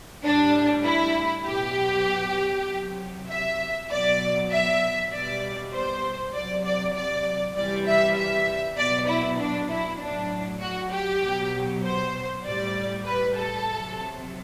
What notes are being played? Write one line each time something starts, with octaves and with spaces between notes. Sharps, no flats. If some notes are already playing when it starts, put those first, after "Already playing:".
A2 G3 D4
E4
B2 F#3 G4
C3 F#3
E5
B2 F#3 D5
E5
B2 G3 D5
C5
C3 F#3 D5
D5
D5
C3 E3 G3 D5
E5
E5
B2 F#3 D5
E4
D4
E4
A2 F#3 D4
F#4
G4
B2 F#3
C5
A2 G3 D5
B4
A4
C3 F#3